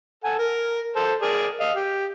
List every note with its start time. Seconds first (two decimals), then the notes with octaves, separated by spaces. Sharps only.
0.24 A4 F#5 G#5
0.39 A#4
0.96 A4 C5
1.22 G#4 A#4 D5
1.60 D#5 F5
1.76 G4